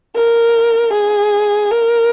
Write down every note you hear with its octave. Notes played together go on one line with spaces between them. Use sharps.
A#4
G#4
A#4